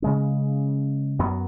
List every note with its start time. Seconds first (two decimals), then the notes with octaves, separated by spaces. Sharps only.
0.02 C#3 G#3 C#4
1.19 F#2 F#3 B3